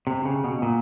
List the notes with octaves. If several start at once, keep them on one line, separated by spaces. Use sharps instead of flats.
C3
C#3
B2
A#2